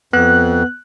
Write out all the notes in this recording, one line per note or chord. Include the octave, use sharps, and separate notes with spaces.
F2 B3 F#6